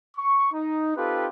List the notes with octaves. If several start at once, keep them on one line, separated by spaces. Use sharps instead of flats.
C#6
D#4
C4 D#4 F4 G4 A4 B4